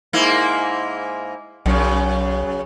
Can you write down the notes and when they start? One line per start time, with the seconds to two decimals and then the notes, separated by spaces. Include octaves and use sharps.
0.13 G#2 A#3 E4
1.66 B1 F#2 C#3